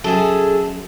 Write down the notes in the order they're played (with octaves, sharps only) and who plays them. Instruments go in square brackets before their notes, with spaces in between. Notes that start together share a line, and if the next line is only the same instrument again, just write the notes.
[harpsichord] F#2 [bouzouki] G#4 A4